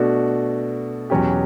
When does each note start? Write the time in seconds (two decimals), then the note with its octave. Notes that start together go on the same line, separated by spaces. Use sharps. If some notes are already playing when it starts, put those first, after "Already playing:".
Already playing: B2 A3 D4 F#4
1.10 E2 B2 F#3 C#4 G4